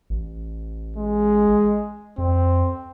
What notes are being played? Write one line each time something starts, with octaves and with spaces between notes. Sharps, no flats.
A1
G#3
F2 C4